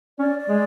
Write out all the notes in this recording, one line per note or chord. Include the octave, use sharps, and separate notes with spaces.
C#4 D5
D5
G#3